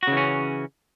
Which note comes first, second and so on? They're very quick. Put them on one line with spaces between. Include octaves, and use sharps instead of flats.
F#4 C#3 E3 C#4